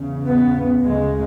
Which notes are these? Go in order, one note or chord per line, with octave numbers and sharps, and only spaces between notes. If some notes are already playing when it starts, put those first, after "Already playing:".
Already playing: E2 C#3
B3
D2 C#3 G#3